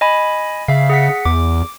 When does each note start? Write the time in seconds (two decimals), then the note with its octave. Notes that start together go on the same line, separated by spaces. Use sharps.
0.01 D#5 G#5 B5
0.68 C#3 E5 F5
0.90 G#4 F#5 B6
1.25 E2 D6